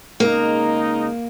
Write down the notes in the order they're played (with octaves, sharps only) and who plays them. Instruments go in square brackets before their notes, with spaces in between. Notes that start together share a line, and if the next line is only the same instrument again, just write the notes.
[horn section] C#3 G#3 D#4 [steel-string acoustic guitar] A#3